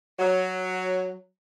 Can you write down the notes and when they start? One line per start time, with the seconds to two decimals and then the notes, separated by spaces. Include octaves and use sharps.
0.18 F#3